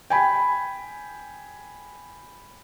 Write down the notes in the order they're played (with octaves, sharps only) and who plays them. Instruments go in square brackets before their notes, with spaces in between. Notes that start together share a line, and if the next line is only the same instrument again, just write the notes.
[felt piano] G5 G#5 B5